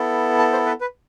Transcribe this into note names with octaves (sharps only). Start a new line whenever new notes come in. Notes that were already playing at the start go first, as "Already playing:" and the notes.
Already playing: B3 E4 A4
A5
C5
B4
B4